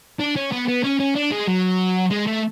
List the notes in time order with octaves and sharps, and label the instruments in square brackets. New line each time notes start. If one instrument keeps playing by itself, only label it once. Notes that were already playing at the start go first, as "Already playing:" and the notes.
[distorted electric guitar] D4
C#4
B3
B3
C#4
C#4
D4
G#3
F#3
G#3
A3